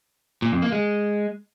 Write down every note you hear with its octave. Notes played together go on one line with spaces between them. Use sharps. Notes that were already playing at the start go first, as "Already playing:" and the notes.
A#2
F2
A#3
G#3